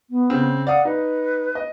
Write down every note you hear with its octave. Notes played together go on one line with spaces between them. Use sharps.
B3
C#3 C4
D5 F5 F#5 D#6
D#4 B4
D#5